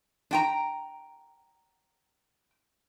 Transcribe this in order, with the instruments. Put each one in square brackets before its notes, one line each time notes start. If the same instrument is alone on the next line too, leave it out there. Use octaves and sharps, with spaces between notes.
[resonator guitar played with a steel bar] D4 G5 A#5